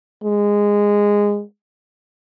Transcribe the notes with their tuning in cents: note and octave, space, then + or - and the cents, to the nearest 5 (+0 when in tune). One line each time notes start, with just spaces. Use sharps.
G#3 -15